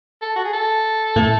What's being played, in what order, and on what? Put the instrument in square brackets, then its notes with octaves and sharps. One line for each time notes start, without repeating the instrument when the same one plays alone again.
[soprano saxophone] A4
F#4
G#4
A4
[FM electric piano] A2 A3